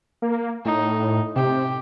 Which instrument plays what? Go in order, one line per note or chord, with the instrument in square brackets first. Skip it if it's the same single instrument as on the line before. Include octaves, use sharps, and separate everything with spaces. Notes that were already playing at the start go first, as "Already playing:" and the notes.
[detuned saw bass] A#3
[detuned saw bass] A2 [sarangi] D#4
[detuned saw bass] C3 [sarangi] G4